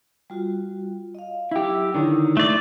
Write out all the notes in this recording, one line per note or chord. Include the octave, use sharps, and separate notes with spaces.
G3 F4 F#4
D#5 F5
F#3 E4 G4 E6
D3 D#3 E4 C#5 D#6
A3 D5